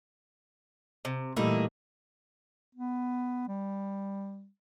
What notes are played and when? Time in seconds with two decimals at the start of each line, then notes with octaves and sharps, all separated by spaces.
1.05 C3
1.36 A#2 E3 G3 A3 A#3 D#4 E4
2.75 B3
3.48 G3